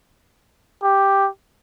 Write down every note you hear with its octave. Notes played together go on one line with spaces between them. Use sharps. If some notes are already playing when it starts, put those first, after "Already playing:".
G4